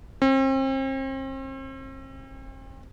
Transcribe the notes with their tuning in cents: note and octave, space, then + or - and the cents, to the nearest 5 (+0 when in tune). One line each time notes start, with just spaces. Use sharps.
C4 +40